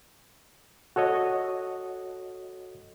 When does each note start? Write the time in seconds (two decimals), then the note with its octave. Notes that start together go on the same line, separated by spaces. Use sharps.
0.96 F#4 A4 C#5 D#5